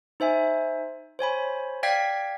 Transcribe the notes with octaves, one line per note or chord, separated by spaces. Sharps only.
D#4 C5 E5 G#5
C5 C#5 G#5 B5
D5 F5 G5 G#6 B6